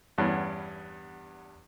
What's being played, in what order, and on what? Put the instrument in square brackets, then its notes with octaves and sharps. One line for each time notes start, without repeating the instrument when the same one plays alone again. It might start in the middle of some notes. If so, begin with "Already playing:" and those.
[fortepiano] E2 G2 B3 C#4